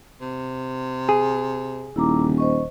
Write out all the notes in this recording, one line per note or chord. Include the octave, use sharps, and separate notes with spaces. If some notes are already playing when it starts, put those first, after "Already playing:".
C3
G#4
D#1 E4 A#5 D6
C5 D#5 C#6